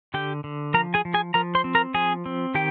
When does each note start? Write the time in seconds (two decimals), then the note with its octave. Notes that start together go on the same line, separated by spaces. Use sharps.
0.14 D3 G4 G5
0.44 D3
0.74 F3 A#4 A#5
0.94 G#4 G#5
1.05 F3
1.14 G#4 G#5
1.34 F3 A#4 A#5
1.55 C5 C6
1.64 C4
1.75 A#4 A#5
1.94 F3 G#4 G#5
2.26 C4
2.55 D#3 G4 G5